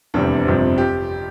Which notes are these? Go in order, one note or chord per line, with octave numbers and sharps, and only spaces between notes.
F1 E2 C3 G3 D4
G1 F2 C3 G3 C4
G4